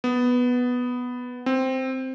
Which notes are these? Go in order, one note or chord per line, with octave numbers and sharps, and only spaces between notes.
B3
C4